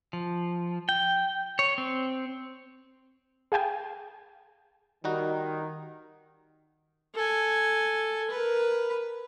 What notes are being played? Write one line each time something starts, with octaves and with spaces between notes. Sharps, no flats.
F3
G5
C#5
C4
G#4 F5 G5 G#5
D#3 G3 D#4 F#4
A4 G#5
A#4 B4